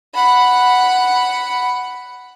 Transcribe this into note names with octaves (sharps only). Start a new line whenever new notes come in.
F#5 B5